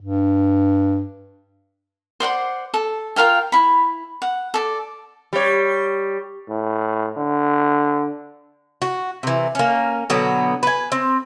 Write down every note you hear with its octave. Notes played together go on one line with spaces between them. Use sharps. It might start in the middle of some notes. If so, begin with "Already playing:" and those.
G2
C5 D5 F#5 C6
A4
F4 A#4 F5 G5
E4 B5
F#5
A4 D5
G3 C#5
A2
D3
F#4
C3 E3
A#3 C#4
B2 D3 F#3 B3
B4 G#5
C4